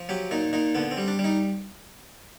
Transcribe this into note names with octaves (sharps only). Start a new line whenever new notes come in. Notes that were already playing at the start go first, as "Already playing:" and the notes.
Already playing: F3
F#3 G4
A#2 D#4
A#2 D#4
D3 B3
C4
G3
D4
G3
D#4